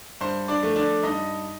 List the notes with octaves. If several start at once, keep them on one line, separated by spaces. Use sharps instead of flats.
G2 C5
D4 D5
F3 A3
D4 D5
G2 D#4 D#5